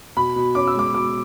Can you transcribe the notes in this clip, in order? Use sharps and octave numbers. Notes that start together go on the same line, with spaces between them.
B2 B5
B2
C#4 D6
E6
G#3 D6
B2 D6